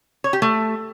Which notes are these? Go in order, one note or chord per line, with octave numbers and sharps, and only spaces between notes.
C#5
G4
A3